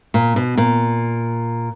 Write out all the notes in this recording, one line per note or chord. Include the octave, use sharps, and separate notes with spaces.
A#2
B2
A#2